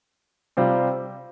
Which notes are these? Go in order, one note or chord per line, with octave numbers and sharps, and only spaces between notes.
C3 G3 C4 F4 C5